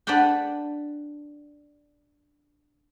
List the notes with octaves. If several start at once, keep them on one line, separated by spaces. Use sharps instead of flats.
D4 B4 D5 F#5 G5